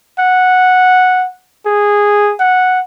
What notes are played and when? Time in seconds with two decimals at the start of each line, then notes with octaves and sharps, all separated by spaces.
0.19 F#5
1.66 G#4
2.40 F#5